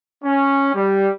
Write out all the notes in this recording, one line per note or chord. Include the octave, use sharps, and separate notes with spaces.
C#4
G3